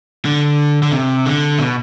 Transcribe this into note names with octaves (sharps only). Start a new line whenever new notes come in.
D3
D3
C3
D3
B2